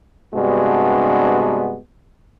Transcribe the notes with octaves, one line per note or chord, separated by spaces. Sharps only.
G2 C3 G#3 B3 D4 F#4